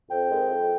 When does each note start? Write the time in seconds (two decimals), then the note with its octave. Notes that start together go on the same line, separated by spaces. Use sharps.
0.10 F2 G5
0.30 D#3 G#3 C4
0.49 F2